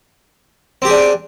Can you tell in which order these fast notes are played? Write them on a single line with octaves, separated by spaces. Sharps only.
C4 G4 G#4 D4